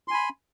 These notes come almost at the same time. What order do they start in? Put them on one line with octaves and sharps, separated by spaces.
C6 G#5 B5